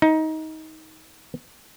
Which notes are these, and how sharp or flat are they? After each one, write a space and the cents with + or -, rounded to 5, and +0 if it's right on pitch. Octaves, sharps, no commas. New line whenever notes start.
D#4 +20